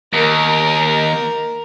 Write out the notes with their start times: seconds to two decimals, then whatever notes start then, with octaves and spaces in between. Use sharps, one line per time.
0.13 D#2 A#4